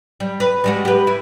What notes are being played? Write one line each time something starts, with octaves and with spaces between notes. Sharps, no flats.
G3
B4
G3 G#3 F#4
G4 B4
E4